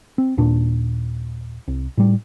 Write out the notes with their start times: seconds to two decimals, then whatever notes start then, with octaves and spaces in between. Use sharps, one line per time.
0.18 C4
0.37 D#2 A#2 D4
1.68 C2
1.97 A2 G3